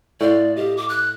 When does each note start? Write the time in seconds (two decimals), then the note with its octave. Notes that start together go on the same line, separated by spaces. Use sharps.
0.21 A2 C5 D5 F5
0.56 G4 D#5 F5
0.77 D6
0.89 F#6